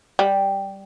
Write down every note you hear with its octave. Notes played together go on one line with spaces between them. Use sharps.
G3